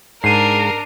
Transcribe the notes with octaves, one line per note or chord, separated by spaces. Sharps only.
G#2 D4 A#4 C7 D#7